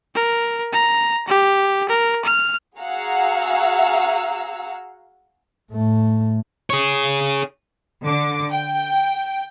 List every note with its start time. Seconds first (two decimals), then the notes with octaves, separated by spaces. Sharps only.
0.15 A#4
0.73 A#5
1.28 G4
1.89 A#4
2.25 F6
2.78 F#4 G#4 F5 F#5 A#5 E6
5.73 A2 A3
6.70 G#4 C#5
8.04 D3 D6
8.51 G5